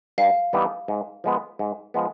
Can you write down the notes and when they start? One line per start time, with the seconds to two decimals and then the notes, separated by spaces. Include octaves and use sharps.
0.18 G2 F5
0.53 E3 G3 B3 D#4
0.88 G#2
1.24 F3 G#3 B3
1.59 G#2
1.94 F3 G#3 B3